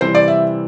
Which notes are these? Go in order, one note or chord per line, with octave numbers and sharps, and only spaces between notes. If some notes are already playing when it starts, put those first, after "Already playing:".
C3 E3 G3 C4 C5
D5
E5